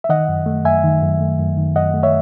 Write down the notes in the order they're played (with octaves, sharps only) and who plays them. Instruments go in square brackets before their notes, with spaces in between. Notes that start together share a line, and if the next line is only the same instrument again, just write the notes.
[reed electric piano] E5
D#3 D#5 F#5
F#2
A3
F#2 E5 G#5
D#3
F#2
A3
F#2
D#3
F#2 D#5 F#5
A3
C#5 E5